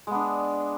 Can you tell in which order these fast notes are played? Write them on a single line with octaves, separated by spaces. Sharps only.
G#3 B3 D4